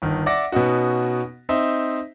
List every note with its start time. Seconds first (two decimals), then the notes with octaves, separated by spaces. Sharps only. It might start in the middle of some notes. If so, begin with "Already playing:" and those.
0.02 G1 D#3
0.26 D5 E5 F#5 D6 A#6
0.52 B2 B3 C#4 D#4 F#4
1.49 C4 D#4 C5 E5